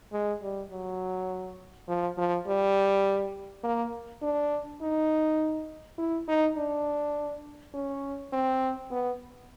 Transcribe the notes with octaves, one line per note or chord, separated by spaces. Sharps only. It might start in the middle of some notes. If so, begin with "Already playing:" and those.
G#3
G3
F#3
F3
F3
G3
A#3
D4
D#4
E4
D#4
D4
C#4
C4
B3